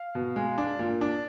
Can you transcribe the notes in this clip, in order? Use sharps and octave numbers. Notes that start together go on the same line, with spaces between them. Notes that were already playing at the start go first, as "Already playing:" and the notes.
Already playing: F5
B2
G#3
D4
A#2
D4